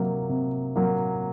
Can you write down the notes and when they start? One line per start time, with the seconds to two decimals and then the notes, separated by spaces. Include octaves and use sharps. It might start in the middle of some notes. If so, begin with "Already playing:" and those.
Already playing: C3 F#3 A#3
0.29 C3
0.76 F#3 A#3